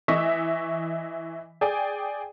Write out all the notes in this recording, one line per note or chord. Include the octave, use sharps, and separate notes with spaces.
E3 D#5 E5 C#6 B6
G#4 D5 G5 G#5